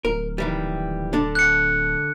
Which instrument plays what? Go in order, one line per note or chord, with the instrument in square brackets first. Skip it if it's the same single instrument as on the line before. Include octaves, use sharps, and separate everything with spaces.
[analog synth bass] D1 [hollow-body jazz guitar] A#4
[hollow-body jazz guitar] D#3 E3 G3
D3 D4
[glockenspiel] F#6 C#7